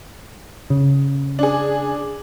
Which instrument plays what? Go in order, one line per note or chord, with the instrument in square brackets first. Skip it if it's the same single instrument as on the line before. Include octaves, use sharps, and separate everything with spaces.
[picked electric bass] C#3
[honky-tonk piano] D4 G#4